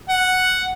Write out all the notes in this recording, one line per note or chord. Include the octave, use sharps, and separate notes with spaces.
F#5